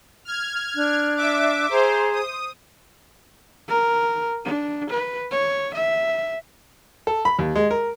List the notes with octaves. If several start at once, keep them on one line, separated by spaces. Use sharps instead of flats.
F6 G#6
D4 F#6
E5 D6
G#4 C5 A#5
D#6
A#4
D4
B4
C#5
E5
A4
B5
D#2
G#3
A#4